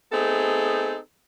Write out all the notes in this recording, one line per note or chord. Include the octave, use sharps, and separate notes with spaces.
A3 B3 C4 D#4 G#4 A4